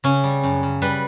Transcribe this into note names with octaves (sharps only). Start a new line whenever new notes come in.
C#3 C#4
G3
F#2
C#3
G3 B4